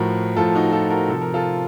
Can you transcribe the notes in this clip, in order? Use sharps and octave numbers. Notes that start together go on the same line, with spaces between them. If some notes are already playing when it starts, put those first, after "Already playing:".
Already playing: A2 F3 F#4 A#4
A2 F3 F4 A4
D#4 F#4
F4 A4
F#4 A#4
C3 F3 A4
A#4
F4 A4